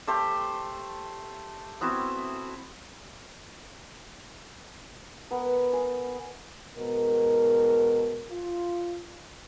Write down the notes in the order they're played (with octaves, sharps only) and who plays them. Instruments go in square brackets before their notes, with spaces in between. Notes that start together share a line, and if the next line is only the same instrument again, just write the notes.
[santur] A3 G4 C5
B3 C4 E4 F#4
[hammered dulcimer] B3 A#4
G#4
[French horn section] G#2 B2 A#4
F4